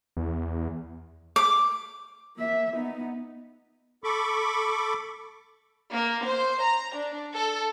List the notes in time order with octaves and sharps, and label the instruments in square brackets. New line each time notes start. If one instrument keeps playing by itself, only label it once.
[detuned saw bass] E2
[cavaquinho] D6
[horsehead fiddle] A#3 E5
B3 D#4
[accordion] A4 B5 C#6 D6
[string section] A#3
C5
A#5
D4
A4